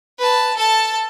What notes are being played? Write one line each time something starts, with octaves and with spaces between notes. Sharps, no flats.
B4 A5
A4 A5